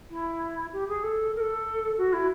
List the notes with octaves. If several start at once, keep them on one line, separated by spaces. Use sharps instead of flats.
E4
G4
G#4
A4
A#4
A4
F#4
E4